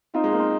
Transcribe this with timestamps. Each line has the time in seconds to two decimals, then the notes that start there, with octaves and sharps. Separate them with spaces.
0.14 C4 D#4 F4
0.24 G#3
0.33 A#3
0.39 C4